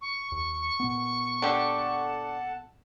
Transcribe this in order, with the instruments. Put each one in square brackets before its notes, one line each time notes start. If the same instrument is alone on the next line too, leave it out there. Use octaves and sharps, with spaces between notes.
[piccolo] C#6
[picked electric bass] D#2
A#2 B3
[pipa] D3 G4 [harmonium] A4 F#5 A5